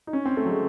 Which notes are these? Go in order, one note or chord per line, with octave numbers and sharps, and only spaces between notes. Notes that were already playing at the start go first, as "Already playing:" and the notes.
D#4
C#4
C4
A3
F#3
G#3